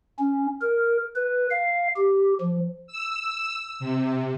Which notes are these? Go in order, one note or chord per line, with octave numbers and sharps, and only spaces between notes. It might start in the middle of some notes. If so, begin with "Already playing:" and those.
C#4
A#4
B4
F5
G4
F3
E6
C3